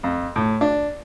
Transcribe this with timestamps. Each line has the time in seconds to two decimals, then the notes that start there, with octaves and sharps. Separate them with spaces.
0.03 F2
0.36 A2
0.61 D4